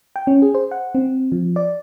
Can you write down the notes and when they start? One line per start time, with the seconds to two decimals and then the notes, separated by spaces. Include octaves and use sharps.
0.16 G5
0.27 C#4
0.42 G#4
0.54 C5
0.71 F#5
0.95 C4
1.32 F3
1.56 D5